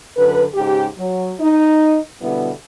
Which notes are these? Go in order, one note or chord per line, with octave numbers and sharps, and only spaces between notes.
F#2 D3 B4
G#2 C#3 G4
F#3
D#4
B2 D3 G3 B3 E4